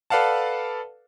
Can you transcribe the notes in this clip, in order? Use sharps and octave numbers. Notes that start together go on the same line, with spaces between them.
A4 B4 D5 F5 F#5 A5